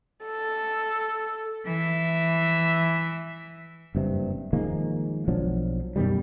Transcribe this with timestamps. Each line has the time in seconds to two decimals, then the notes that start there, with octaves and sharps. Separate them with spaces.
0.25 A4
1.65 E3 E5
3.95 F#1 G2 C3
4.53 D#3 F3 G#3 A#3
5.28 B1 F3 F#3 D4
5.96 F#2 B2 D#3 G3